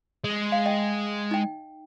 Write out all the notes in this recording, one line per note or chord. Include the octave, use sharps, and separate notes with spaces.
G#3
F5
D#5 G5
D#4 G5